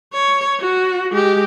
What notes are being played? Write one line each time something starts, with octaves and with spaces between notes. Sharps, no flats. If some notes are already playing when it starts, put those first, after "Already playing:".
C#5
F#4
G#3 G4